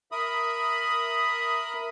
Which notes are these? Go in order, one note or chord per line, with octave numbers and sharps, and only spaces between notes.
A#4 E5 B5 D#6